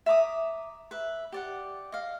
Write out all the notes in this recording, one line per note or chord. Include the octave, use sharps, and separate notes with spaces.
E5 A#5 D6 D#6
B4 E5
G4 D5 F#5
D#5 F5